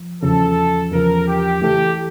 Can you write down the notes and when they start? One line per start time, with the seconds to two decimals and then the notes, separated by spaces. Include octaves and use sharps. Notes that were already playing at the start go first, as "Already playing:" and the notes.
Already playing: F3
0.23 E2 C#3 F3 A4
0.91 E2 C#3 F3 A#4
1.27 G4
1.61 E3 A3 E4 G4 A4